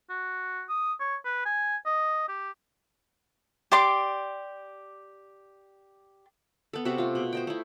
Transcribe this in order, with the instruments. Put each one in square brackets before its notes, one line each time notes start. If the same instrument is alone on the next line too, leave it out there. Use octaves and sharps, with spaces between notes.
[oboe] F#4
D#6
C#5
B4
G#5
D#5
G4
[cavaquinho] G4 D5 C6 D6
[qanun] B3 A4
C3 B3 F#4 E5
A3 F4
B2
C5 D#5 G5
A3 E4